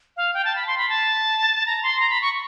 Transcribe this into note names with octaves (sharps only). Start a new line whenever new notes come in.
F5
G5
A5
B5
C6
B5
A5
A#5
C6
A#5
B5
C#6